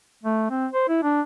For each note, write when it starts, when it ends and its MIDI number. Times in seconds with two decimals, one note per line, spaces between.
0.23 0.47 57
0.50 0.67 60
0.73 0.87 72
0.89 0.98 64
1.03 1.21 62